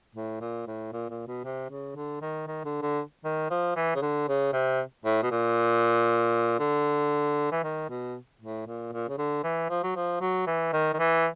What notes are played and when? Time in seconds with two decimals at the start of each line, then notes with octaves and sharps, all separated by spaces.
0.15 A2
0.41 A#2
0.67 A2
0.93 A#2
1.10 A#2
1.28 B2
1.45 C3
1.70 C#3
1.96 D3
2.22 D#3
2.48 D#3
2.65 D3
2.82 D3
3.25 D#3
3.51 F3
3.76 E3
3.95 C#3
4.02 D3
4.29 C#3
4.53 C3
5.05 A2
5.23 B2
5.31 A#2
6.60 D3
7.52 E3
7.64 D#3
7.90 B2
8.41 A2
8.67 A#2
8.93 A#2
9.09 C#3
9.18 D3
9.44 E3
9.70 F3
9.84 F#3
9.96 F3
10.21 F#3
10.47 E3
10.73 D#3
10.94 D#3
10.99 E3